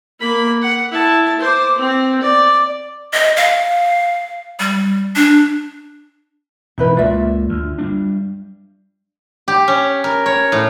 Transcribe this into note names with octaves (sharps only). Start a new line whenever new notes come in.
A#3 B5
F#5
E4 A5
C5 D6
C4
D5
D#5
F5
G3
D4
E1 E2 D#4 E4 B4
C#2 A#3 F4 D5 E5
D2
G3 G#3 D4
G4
C#4
A#4
C#5
A2